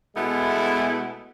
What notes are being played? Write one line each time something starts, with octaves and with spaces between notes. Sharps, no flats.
B2 G#3 A3 B3 E4